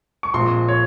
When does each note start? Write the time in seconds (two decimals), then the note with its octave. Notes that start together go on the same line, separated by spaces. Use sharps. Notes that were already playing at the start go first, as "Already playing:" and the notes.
0.23 C#6
0.34 A#1 A#2 G#3 C4 C6
0.69 C#5